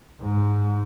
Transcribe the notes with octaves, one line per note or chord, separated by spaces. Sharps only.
G#2